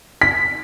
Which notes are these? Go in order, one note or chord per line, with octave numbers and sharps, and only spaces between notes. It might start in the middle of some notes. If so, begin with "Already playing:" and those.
B6